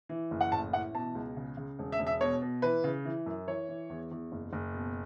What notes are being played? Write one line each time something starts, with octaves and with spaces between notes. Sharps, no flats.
E3
F#1
F#5
A1 A5
E3 F#5
B2 A5
C#2
C#3
C#3
E1
E5
E1
E5
B2 C#5
B2
E3 B4
C#3
E3
F#2
E3 C#5
E3
E2
E2
F#1
F#1
B2